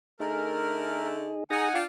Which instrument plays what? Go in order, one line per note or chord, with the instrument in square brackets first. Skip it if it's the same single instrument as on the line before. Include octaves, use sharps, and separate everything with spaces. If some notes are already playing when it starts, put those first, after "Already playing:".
[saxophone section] D3 A3 [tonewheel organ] D#4 G#4 [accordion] A#4
[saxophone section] D#4 [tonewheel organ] G#4 A#6 [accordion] F#5 G#5
[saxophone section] D4 F4 [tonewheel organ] G5